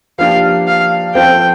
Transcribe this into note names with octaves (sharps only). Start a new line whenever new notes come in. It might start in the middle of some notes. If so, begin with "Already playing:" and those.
F3 A#3 D4 G4 F5
F5
F3 C4 F4 A4 C5 G5